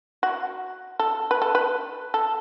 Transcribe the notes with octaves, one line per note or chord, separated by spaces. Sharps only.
F#4
A4
B4
A4
B4
A4